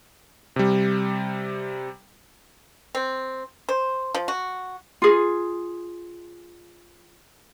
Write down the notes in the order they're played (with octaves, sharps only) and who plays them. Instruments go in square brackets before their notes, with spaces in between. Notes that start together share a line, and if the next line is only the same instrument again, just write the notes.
[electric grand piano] C3 G3
[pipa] C4
C5
F3
F#4
[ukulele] F4 G#4